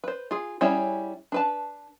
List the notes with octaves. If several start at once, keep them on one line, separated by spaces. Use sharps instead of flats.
B4 C5
F4 G#4
G3 C#4 E4 G#4 C#5
D4 B4 A5